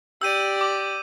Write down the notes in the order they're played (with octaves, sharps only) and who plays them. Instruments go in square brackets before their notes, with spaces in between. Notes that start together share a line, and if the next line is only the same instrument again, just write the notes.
[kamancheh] G4 D5 [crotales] E6 G6 D#7
[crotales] D6